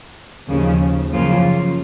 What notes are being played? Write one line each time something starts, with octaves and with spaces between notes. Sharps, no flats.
D#2 C#3 F3
F#2 C#3 F3 A#3 F4